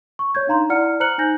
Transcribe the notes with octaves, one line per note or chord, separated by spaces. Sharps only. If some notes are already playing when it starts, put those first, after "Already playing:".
C#6
C#5 G6 G#6
D4 D#4 F5 A#5 C6
E4 D5 F#5 F6 C#7
C5 A#5 F6 F#6 C#7 F#7
D#4 G#5 G6 A#6 F#7